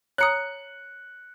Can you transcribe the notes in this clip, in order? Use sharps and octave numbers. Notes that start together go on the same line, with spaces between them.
C#5 A#5 D#6 F#6 C#7